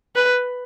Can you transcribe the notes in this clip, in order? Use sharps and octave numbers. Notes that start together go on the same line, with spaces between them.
B4